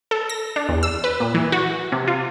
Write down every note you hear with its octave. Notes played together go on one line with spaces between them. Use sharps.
A4
A#6
D4
E2
E6
B4
A#2
E3
F#4
C3
F4